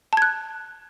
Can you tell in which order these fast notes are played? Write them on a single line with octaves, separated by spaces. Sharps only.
A5 G#6 F#6